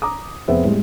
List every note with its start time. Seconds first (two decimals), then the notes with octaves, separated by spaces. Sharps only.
0.02 A#5 D6 D#6
0.48 F1 B3 C4 G#4 E5
0.64 A2 G3 G#3